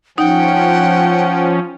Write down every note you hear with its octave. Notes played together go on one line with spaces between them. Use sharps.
F3 C#4 D#4 F#5 G5